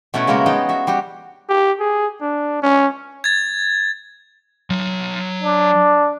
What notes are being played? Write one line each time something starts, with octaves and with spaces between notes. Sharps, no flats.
B2 A3 C#4 E4 F#5
C#3 G#3 A#3 F#4 A#4
B3 D#4 G#4 D#5 G5
F#4 E5
G3 F#4 G4
G4
G#4
D4
C#4
G#6 A6
F#3 C6
D4